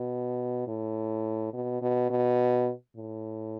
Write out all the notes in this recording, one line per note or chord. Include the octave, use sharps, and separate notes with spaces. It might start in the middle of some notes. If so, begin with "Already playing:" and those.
Already playing: B2
A2
B2
B2
B2
A2